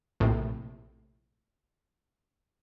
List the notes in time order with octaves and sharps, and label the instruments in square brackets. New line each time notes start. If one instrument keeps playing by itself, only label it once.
[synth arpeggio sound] A#1 A2 C3